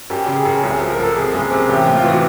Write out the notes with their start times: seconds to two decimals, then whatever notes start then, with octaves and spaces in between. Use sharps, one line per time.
0.10 F#2 G4
0.26 C#3 G4
0.36 G#4
0.45 F#2
0.63 C2 G#4
0.80 F3
0.90 A#4
0.99 F3 A4
1.16 C3 G#4
1.33 F#1 G#4
1.51 C3 G#4
1.69 A1 G4
1.87 A3
1.95 F4
2.04 E3 F#4